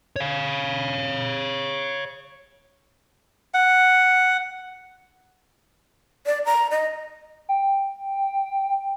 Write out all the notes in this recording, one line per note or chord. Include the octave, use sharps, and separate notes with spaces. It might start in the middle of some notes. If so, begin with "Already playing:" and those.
C#5 F5
F#5
D5
A#5
D#5
G5